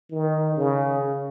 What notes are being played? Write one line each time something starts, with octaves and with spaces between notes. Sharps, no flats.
D#3
C#3